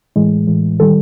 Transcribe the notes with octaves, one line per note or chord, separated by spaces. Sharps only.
A2 E3 G#3
A2 E3 G#3
D#3 G3 A4